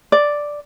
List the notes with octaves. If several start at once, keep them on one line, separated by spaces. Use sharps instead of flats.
D5